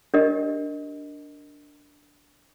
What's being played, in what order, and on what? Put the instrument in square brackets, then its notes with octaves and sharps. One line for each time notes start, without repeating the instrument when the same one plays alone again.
[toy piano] D4 G4 A#4 D#5